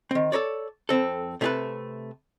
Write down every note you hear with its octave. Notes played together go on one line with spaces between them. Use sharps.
D#3 C4
A4 A#4 C#5 D5
F2 C4 A4
C3 A3 D4 G#4 A4 B4